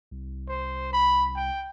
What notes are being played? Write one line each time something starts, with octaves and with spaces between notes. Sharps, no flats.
C2
C5
B5
G5